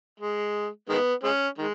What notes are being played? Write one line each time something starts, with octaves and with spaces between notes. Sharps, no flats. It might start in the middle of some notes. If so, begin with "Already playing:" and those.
G#3
D#3 G#3 B3
G#3 C#4
D#3 G#3